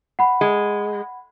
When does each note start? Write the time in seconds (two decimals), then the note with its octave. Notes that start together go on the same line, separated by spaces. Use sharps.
0.19 F#5 B5
0.41 G#3